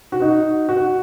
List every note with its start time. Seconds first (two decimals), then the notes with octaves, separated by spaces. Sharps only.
0.12 F#4
0.22 D#4
0.69 F#4